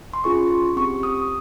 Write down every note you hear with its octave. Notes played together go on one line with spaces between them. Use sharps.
C6
C#4 F4 G#4 C#6
C4 G4 C#6
D#6